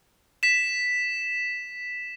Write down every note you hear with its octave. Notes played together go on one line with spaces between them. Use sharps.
B6 E7